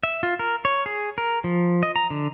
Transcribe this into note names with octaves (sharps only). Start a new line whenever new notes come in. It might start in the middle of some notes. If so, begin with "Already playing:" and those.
E5
F4
A#4
C#5
G#4
A#4
F3
D#5
A#5
D3